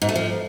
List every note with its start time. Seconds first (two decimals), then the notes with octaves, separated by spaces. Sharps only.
0.02 G#2
0.09 A3
0.16 F3